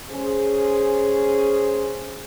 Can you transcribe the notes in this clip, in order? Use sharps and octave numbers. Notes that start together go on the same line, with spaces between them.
C#4 G#4 C5